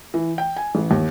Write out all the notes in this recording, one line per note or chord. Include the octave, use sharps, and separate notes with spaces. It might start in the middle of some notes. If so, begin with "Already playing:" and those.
E3
G5
G#5
A1
D#2